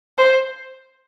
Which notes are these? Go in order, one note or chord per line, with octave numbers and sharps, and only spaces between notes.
C5